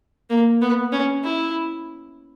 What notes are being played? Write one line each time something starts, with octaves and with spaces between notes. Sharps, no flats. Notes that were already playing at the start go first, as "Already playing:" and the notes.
A#3
B3
C#4
E4